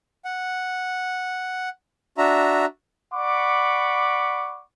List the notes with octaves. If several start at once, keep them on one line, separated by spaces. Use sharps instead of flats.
F#5
D4 F#4 E5 A#5
D5 F#5 B5 C#6 D6